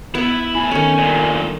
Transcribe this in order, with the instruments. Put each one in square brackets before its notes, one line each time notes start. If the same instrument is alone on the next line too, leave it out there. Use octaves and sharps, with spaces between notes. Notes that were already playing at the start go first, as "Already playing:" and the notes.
[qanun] B3 [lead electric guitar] E4
[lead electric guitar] A3 B5 [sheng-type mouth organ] G#5
[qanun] D#3 A3 [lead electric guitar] C#4
[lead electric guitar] G2 A#2